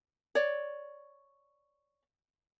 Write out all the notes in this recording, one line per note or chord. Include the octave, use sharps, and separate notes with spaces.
C#5 D5